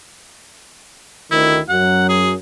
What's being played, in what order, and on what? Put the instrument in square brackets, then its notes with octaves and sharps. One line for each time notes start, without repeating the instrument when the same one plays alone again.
[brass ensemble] D2 D#3 [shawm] E4
[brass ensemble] F#2 F#3 [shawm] F#5
[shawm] G#4